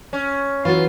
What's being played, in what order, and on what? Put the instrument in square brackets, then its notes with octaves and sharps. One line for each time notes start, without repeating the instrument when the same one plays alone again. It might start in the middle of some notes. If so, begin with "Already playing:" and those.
[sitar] C#4
[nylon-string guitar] E3 F#4 [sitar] F#3 F4